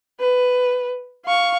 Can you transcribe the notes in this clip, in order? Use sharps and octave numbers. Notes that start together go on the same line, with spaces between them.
B4
F5 C#6